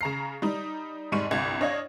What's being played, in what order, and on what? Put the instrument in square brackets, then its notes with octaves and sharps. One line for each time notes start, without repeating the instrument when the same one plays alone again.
[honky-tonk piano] C#3 A#5 C7
G3 D#4
F1 G#2 G3 C#6 D#7
G1 C2 F5 G#6
D4 C#5 D#5 F5